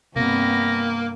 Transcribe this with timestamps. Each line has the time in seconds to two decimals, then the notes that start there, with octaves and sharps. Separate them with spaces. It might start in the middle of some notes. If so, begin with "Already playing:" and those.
0.16 G2 C3 A#3 B3 A#6